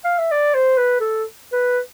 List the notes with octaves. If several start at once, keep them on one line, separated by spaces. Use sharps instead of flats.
F5
E5
D5
C5
B4
A4
B4